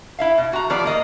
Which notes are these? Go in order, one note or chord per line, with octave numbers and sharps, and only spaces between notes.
E4 E5 F5
B2
A2 F#4 G5 A#5
D#3 F3 B3 G4 D5
G#2 A#3 D#5